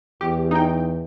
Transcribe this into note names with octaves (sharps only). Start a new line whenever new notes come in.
E2 G4
D#4 G5